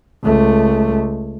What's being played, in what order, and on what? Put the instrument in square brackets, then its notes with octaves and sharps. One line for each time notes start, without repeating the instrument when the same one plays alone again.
[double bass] C#2 A3